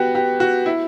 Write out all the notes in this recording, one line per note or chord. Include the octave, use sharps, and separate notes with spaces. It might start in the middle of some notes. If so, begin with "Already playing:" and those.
Already playing: B3 F#4 G4
G4
F#4
E4